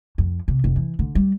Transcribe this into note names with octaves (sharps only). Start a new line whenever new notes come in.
F2
C3
F1
E3
D3
G3